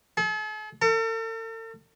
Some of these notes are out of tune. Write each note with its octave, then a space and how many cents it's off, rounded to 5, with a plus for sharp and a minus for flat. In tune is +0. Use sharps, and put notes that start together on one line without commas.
A4 -45
A4 +45